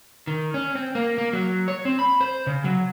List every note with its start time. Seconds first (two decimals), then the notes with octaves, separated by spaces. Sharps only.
0.27 D#3
0.54 C#4
0.75 C4
0.95 A#3
1.18 A#3
1.33 F#3
1.68 C#5
1.85 C4
1.99 B5
2.21 C5
2.47 C#3
2.64 F#3